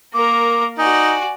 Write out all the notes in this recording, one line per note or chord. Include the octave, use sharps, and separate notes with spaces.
A#3 A#4 D6
D#4 F#4 D5 G#5